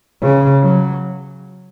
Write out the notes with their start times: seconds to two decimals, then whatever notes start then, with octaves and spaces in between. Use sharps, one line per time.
0.21 C#3
0.63 F#3